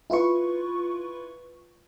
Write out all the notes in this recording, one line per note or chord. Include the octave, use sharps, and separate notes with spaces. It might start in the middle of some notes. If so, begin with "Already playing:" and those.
E4 F4 B4 C#6